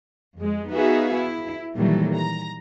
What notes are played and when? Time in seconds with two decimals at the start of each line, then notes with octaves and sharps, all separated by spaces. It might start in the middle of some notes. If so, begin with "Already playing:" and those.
0.37 F2 G#3
0.71 B3 D#4 F#4 G#4 E5 F5
1.15 E4
1.76 A#2 D#3 E3 F#3 G3 A3
2.16 A#5